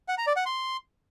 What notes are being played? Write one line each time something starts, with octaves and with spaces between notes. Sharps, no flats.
F#5
A#5
D5
F#5
C6